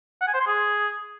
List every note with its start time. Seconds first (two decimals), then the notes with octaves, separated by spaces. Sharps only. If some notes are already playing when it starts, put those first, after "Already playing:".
0.21 F#5
0.28 G#5
0.34 C5
0.40 C6
0.47 G#4